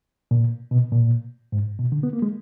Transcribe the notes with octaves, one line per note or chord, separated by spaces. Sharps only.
A#2
B2
A#2
G#2
B2
D3
B3
A#3
G#3